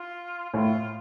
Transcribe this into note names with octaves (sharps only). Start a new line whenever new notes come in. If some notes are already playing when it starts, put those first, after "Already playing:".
Already playing: F4
A2 F4